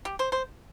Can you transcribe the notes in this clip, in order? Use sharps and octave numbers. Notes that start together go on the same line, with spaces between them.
G4
C5
C5